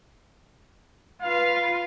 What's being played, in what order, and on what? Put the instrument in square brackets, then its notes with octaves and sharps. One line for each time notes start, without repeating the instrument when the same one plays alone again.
[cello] F4 B4 [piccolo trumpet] F5